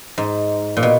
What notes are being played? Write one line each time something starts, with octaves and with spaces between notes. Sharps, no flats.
G#2
A#2
B2